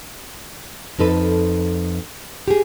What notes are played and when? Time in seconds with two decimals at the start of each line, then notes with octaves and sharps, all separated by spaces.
0.99 F2 D#4 A4 B4
2.48 G4 G#4